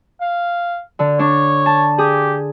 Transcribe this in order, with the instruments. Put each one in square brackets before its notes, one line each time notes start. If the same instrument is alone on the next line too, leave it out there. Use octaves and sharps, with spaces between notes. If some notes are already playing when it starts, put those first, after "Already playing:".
[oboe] F5
[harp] D3
[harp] D4 [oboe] C#5
[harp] A5
[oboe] G4 [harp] G#4